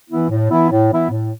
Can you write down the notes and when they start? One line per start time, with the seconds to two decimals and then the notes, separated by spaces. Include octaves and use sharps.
0.09 E3 B3 E4
0.30 A2
0.49 E3 B3 E4
0.71 A2
0.90 E3 B3 E4
1.11 A2